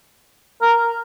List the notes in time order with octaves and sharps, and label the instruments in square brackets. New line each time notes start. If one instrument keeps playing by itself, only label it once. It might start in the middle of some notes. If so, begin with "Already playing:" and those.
[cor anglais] A#4